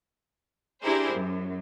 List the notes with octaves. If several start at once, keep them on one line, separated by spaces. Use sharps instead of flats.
D4 E4 G4 G#4 A#4 C5
F#2